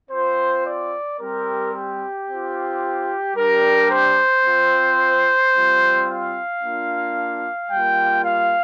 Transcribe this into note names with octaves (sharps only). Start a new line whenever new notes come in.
C4 F4 C5
D5
G3 C4 G4 A#4
G4
C4 F4
G3 D4 G4 A#4
C5
C4 F4
G3 C4 F4
F5
A#3 D4 F4
G3 A#3 F4 G5
F5